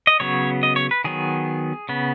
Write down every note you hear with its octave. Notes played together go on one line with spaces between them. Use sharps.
D#5
C#3 F#3 B3 C#5
D#5
C#5
B4
D#3 F#3 B3 G#4
C#3 B3